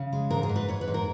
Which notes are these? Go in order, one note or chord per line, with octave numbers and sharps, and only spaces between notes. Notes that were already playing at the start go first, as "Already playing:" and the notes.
Already playing: C#3
G#3
G#2 A#4
G#4
G#2
B4
G#2 C#5
B4
G#2
A#4